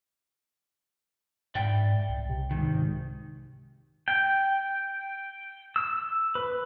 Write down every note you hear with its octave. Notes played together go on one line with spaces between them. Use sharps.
G#2 D5 E5 G5
C2
C3
G#2 D#3
G5
E6
B4